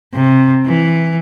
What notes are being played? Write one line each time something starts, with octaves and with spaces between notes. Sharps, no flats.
C3
E3